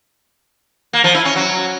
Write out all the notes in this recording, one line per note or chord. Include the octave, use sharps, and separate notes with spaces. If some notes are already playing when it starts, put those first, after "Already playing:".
A#3
F3
E4
C#4
F#3